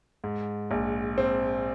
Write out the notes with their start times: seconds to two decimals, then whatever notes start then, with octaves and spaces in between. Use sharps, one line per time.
0.24 G#2
0.71 A#1
1.18 C4